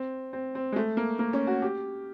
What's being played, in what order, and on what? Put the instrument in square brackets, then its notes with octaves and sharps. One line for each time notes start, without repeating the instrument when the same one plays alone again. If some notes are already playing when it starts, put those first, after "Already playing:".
Already playing: [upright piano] C4
C4
C4
G#3
A3
A#3
A#3
C#4
F#4
G4